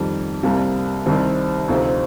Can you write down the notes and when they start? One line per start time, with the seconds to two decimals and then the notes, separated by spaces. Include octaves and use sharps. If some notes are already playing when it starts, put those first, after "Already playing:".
Already playing: F2 D#3 G3
0.43 C2 C3 G3 A#3
1.06 C2 C3 D#3 G3 C4
1.68 D2 C3 F3 C4 D#4